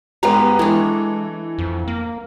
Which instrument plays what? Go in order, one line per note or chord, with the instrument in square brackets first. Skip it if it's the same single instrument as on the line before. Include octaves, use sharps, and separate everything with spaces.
[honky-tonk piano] G#2 B3 [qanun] G3 G#3 F5 [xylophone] A#5
[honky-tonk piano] E3 [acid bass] G#3 [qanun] A3 D4
[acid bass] F2
A#3